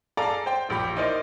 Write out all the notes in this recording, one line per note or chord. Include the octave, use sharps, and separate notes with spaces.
G#4 A4 D5 F5 A5 A#5
C5 G5
E1 A#1 G4 B5
D#4 E4 A#4 C5 D5 D#5